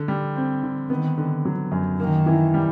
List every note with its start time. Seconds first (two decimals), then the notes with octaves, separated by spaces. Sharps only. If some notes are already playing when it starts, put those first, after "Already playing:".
Already playing: D3
0.08 G3
0.36 C4
0.63 D3
0.90 D#3 B3
1.18 D3
1.45 F#3
1.71 F#2
1.99 D#3 A#3
2.26 E3
2.54 G3